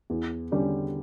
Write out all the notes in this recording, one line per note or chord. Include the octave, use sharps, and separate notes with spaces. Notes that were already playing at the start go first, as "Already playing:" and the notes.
E2
D3 G3 C#4 G4